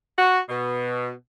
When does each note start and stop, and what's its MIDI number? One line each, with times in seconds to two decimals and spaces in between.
0.19 0.40 66
0.49 1.11 47